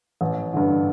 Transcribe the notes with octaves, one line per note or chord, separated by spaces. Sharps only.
A1
G2 D3